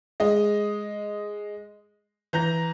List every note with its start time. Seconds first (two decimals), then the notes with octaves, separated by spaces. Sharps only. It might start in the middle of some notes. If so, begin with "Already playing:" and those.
0.20 G#3 D#5
2.33 E3 A#5 G6 A#6